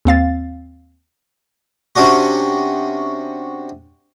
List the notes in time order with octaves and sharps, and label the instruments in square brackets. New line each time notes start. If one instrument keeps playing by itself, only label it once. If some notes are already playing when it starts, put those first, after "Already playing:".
[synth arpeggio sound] D#2 C4 F5 A6
[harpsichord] C3 C#4 D4 F#4